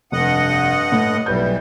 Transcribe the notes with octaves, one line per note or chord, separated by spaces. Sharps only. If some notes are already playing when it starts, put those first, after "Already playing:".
F1 G2 D#5 F#5
A2
B1 E3 G3 B4 G6